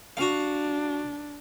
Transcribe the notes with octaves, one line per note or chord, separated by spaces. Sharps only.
D4 F#4 F5